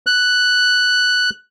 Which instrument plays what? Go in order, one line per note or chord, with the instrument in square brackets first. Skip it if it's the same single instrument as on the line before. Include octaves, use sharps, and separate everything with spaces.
[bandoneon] F#6